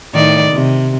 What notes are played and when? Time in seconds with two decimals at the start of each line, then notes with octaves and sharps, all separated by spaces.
0.13 A2 D#3 D5
0.52 C3